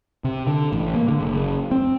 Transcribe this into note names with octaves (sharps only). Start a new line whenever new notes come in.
C3
D3
A1
A#3
D3
F#1
C4